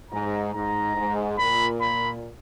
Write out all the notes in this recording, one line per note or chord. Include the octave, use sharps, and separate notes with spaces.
G#2 A#5
G#2 A#5
G#2
A#2 B5
B5